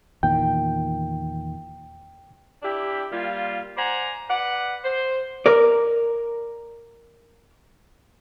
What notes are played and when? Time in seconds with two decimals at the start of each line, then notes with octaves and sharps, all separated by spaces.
0.23 E2 A#2 D#3 G5
2.63 D4 E4 G4
3.12 G3 A#3 F4
3.77 C5 D5 F#5 G#5 A#5
4.29 B4 D5 F#5
4.84 C5
5.46 A#4 D5